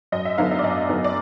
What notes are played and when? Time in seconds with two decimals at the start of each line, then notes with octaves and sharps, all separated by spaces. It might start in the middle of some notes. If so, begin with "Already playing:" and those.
0.12 F#2 D#5
0.25 E5
0.38 D3 F#3 B3 D4 F5
0.51 D#5
0.59 D5
0.63 F#2 D#5
0.89 D3 F#3 B3 D4
1.04 D5